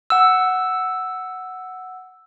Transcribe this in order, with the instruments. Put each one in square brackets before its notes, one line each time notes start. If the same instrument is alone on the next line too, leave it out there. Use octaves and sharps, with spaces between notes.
[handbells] F#5 E6